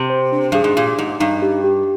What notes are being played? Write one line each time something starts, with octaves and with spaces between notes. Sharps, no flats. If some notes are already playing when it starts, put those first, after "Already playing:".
Already playing: C3
C5
D4
G2 G#4
G#2
A#2 G4
G#2 D#4
G2 D#4
G4
G4